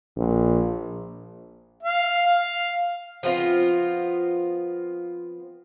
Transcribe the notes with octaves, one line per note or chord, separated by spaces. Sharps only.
A#1
F5
F5
F3 B3 C4 F4